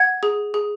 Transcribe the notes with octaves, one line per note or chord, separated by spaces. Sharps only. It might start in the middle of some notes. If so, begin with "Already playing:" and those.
Already playing: F#5 G#6
G#4
G#4